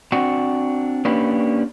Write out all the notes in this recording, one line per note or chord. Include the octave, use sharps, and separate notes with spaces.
C4 D4 F#4 F#5
A#3 C#4 D4 G4 B4